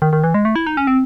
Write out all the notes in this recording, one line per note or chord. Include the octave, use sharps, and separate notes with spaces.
D#3
D#3
E3
G#3
A3
E4
D#4
C#4
C4